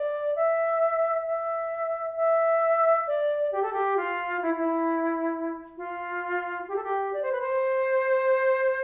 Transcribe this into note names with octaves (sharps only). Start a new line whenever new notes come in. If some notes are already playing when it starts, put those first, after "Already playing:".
Already playing: D5
E5
E5
E5
D5
G4
A4
G4
F4
E4
E4
F4
G4
A4
G4
D5
C5
B4
C5